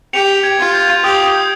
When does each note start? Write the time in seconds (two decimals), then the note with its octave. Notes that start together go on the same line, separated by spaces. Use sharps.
0.13 G4 C#7 F7
0.43 G#6
0.59 F4
0.74 G6
1.04 G4 D#6
1.26 D#6